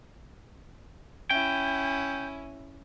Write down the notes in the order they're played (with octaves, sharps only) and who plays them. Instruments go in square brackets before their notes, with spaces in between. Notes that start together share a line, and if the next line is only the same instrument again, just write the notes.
[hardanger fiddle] C#4 E4 [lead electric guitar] G5